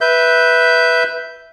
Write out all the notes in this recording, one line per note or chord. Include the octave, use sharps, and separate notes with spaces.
B4 E5 G6